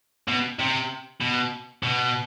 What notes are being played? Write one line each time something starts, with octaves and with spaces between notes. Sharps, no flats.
B2
C3
B2
B2